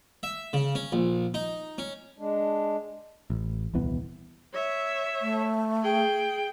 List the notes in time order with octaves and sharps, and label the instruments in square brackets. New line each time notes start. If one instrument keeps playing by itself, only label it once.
[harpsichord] E5
C#3
C#4
A#1
D#4
C#4
[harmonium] G#3 D4
[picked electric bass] A1
D#1 C2 E3 B3
[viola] C#5 E5
[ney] A3
[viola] G#4 G5